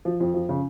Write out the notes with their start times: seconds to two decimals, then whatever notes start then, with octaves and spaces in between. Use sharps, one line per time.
0.05 F3
0.20 F2
0.34 F3
0.49 C#3